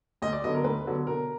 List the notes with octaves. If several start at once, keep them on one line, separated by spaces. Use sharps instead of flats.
D2 D#5
D5
D3 F#3 B3 D#5
A#4
D2 B4
D3 F#3 B3
B2 A#4